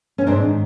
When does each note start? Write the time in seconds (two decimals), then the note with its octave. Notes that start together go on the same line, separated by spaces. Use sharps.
0.18 C#4
0.27 G#2 C4 D4
0.42 D#3